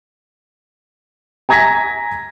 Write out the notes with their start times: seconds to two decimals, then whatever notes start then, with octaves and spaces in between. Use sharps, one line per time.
1.49 G#5 A#5 G#6 A#6 B6